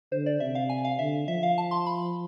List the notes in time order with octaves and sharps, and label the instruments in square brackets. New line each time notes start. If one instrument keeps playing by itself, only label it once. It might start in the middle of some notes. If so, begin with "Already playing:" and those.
[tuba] D3 [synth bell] C5
[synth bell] D5
[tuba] C3 [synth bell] E5
[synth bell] F5
G#5
F5
[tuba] D3 [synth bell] E5
[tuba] F3 [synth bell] E5
[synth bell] F5
A5
C6
B5